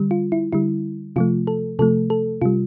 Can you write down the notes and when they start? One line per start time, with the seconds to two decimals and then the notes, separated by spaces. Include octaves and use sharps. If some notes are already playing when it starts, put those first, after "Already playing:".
Already playing: D3 G3
0.11 F4
0.32 E4
0.53 D3 G3 E4
1.16 C3 F3 A3 F4
1.47 A4
1.79 C3 F3 A3 A4
2.10 A4
2.42 C3 G3 F4